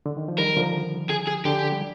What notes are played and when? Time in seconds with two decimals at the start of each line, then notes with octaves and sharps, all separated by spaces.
0.06 D3
0.17 D#3
0.28 F3
0.38 D#3 G3 A#4
0.57 D3 F3
1.10 G#4
1.27 G#4
1.45 D3 G4
1.72 G3